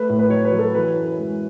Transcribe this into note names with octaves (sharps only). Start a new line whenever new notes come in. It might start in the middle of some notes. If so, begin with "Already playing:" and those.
Already playing: A3 B4
A2
B4
F#3 C#5
B4
F#3
A4
E3 B4
F#2
G#3